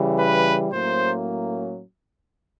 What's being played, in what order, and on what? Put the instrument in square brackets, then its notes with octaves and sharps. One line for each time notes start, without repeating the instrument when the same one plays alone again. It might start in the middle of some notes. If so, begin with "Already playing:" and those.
Already playing: [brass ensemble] C#3 E3 G3
B4
A2 F#3 A#3 C#4 C5